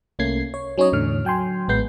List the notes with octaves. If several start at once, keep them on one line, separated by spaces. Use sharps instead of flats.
C2 A3 A#3 C#4 G#6 C7
C#5
F#3 C#4 D#4 C#5 D#5
E2 A2 D3 F6
F#3 G5 G#5 C6
A1 G#3 B3 G6 C7